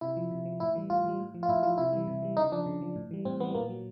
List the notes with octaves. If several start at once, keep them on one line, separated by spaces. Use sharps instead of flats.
C3 E4
F3
C3
F3
A2 E4
E3 G3
A2 F4
E3 G3
A2
F3
F4
A2 E4
F3 F4
C3 E4
E3 G3
C3
E3 G3
C#3 D#4
F3 D4
C#3
F3
A2
E3 G3
A2 C4
E3 G3 B3
A#2 A#3
F#3